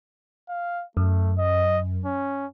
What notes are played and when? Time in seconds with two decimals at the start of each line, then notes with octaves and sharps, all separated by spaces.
0.49 F5
0.97 F#2 A3
1.38 D#5
2.05 C#4